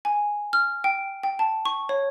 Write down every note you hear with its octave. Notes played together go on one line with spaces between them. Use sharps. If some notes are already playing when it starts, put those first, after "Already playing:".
G#5
F6
G5
G5
A5
C#6
C#5